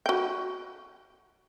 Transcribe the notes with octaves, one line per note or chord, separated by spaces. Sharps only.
F#4 G5